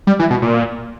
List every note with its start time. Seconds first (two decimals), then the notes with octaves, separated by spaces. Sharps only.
0.07 G3
0.19 E3
0.30 B2
0.42 A#2